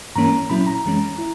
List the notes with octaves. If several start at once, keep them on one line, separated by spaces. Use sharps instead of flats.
G#2 E3 A#3 C#4 A#5
A#2 F#3 C#4 E4 B5
A#5
F#2 E3 G#3 C#4
E4